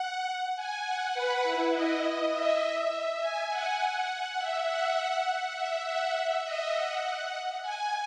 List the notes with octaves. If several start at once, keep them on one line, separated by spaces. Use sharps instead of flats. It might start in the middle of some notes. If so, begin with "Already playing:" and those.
Already playing: F#5
G#5
F#5
B4
E4
D#5
E5
G#5
F#5
E5
F#5
F#5
E5
F#5
E5
D#5
F#5
G#5